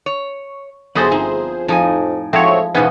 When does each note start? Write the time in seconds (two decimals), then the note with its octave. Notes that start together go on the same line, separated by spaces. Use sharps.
0.06 C#5
0.95 G1 F#3 E4 F#4 G#4 A4 C5
1.12 F3 C4 D#4
1.68 F2 A2 F3 D#4 G#5
2.33 F3 G#3 A3 C4 E4 F#4 C#5
2.75 E2 G#2 B2 E3 B3 C#4 D#4 F4